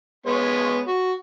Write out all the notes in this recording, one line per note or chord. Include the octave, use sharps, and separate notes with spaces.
G#3 B3 C#5
F#4